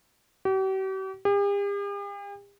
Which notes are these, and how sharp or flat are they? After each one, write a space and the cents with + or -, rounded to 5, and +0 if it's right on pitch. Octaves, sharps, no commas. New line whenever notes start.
G4 -45
G4 +45